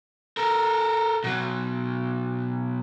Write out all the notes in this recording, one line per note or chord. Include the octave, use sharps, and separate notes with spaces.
A4 A#4
B2 F#3